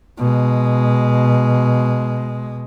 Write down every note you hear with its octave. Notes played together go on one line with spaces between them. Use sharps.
B2 G#3